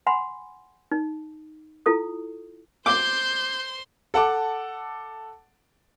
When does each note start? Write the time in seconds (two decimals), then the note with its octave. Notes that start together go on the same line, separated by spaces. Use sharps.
0.07 F#5 G#5 B5 C6
0.92 D#4
1.86 E4 F4 A4 D#6
2.86 C5 C6 D6 G6
4.14 A4 F#5 A5 D6